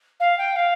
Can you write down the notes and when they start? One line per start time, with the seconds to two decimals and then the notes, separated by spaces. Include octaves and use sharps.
0.20 F5
0.38 G5
0.56 F5